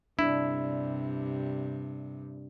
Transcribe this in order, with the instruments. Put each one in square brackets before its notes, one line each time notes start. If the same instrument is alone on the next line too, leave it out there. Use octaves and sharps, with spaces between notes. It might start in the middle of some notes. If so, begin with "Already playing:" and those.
[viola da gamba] G2 C3 [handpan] D4 [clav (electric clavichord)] E4